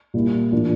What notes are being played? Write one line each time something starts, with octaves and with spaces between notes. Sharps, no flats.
A#2 G3 A#3 E4
A2 E3 A#3 D4 F4